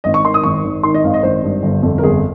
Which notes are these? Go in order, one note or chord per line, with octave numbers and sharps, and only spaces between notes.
G#1 D#5
C#6
D#3 C6
D#6
G#1 C#6
G#1
D#3 C6
D#5
G#1 F5
D#5
G#1 C5
G2
G1
F2
A#4
G1 G#4